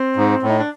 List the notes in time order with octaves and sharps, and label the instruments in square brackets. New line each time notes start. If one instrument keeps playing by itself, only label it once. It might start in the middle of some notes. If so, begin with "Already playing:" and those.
Already playing: [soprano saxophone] C4
[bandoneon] G#2
A2
[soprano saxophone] D#4
D4